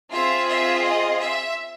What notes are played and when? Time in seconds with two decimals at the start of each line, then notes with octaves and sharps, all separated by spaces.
0.12 C4 F4 G#4 E5
0.47 E5
0.83 D#5
1.19 E5